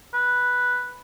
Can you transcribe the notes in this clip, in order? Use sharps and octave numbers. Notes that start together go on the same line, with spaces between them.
B4